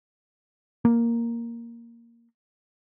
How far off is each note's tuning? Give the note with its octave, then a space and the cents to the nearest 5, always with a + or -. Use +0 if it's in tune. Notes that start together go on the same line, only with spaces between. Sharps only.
A#3 +0